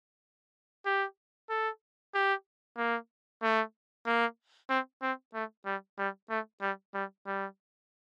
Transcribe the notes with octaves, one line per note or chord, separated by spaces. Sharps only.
G4
A4
G4
A#3
A3
A#3
C4
C4
A3
G3
G3
A3
G3
G3
G3